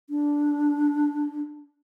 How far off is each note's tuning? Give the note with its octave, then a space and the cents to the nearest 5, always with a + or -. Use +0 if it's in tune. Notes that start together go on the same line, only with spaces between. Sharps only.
D4 -5